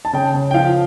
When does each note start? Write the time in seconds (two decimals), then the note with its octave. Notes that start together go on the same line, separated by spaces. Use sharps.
0.05 A5
0.13 C#3 G5
0.34 C#3
0.51 G5
0.54 F3 F5